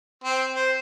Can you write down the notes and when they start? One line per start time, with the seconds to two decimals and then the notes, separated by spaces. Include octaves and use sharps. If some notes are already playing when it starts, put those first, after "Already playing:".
0.24 C4
0.56 C5